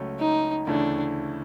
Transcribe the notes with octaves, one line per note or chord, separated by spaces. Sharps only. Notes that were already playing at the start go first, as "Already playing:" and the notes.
Already playing: C#2 C#3 F#3 A3 C#4
D#4
D2 C#3 E3 A3 D4